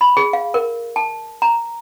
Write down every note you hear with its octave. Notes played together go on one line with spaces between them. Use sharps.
B5
G#4
F5
A#4
A5
A#5